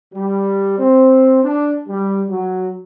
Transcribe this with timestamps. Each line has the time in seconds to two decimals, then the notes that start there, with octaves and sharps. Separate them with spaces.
0.15 G3
0.79 C4
1.44 D4
1.89 G3
2.30 F#3